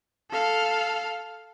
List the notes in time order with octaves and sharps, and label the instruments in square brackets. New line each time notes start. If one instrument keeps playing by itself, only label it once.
[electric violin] A4 F5